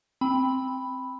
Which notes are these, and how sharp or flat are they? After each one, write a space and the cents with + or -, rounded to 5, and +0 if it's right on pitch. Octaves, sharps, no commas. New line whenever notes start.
C4 +0 G5 +20 B5 +0